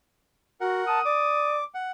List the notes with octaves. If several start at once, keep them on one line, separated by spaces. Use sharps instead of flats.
F#4 A#4 F#5
A5 D#6
D5 D6
F#5